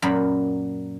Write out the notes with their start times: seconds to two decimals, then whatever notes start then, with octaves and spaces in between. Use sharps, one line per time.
0.02 F#2 A#2 B5